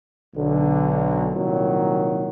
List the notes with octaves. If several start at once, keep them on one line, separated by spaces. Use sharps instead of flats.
B1 D3
C2 A#2 D#3 F#3